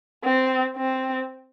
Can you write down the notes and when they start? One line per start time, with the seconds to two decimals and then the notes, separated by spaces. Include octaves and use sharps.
0.24 C4
0.77 C4